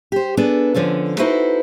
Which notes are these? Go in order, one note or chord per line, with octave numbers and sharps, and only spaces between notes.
G4 C5
B3 D4 G#4 A4
D3 F3 C#4 A4
D#4 E4 F#4 A4 B4 C5